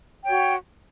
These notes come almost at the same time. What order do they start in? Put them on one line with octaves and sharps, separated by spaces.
G5 C#5 F#4